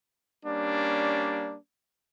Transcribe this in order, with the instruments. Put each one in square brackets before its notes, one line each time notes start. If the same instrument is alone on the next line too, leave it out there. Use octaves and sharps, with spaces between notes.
[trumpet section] G3 A#3 C#4 D4